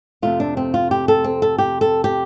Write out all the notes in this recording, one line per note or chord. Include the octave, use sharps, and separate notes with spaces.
F2 C3 A3 F4
D4
C4
F4
G4
A4
C4
A4
G4
A4
G4